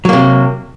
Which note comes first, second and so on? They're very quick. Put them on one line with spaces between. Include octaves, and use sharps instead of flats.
F#3 A#3 C3